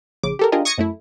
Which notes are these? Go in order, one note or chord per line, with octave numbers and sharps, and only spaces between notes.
A#1 C#3 D6
G4 A4 A#4
D4 F4 G4 G#4 A#4 D#5
C#6 D#6 G#6 A#6 C#7
F#2 A3 E4